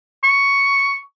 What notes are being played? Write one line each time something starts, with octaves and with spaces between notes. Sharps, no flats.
C#6